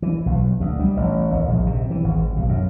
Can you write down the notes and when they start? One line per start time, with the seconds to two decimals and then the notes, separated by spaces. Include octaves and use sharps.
0.02 E3
0.26 B1
0.60 D2
0.80 G3
0.97 A1
1.34 D#2
1.48 A#1
1.66 C3
1.90 E3
2.04 G#1
2.36 B1
2.49 F#2